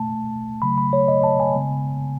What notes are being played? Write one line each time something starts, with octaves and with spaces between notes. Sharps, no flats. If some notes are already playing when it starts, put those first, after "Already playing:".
Already playing: B2 A3 A5
C#3 F#3 A3 B5
B5
C#5
D#5
A5
G#5
C#3 G#3 B3